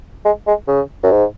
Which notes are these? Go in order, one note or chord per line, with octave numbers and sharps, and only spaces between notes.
G#3
G#3
C#3
F#2
G#2